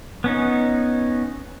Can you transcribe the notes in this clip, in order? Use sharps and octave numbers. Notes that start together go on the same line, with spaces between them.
B3 C#4 D#4